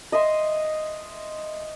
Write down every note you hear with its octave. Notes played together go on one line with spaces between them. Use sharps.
D#5 E5 C6